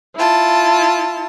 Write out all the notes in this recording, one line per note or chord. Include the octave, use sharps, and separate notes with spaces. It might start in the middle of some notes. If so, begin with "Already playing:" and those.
E4 F4 A5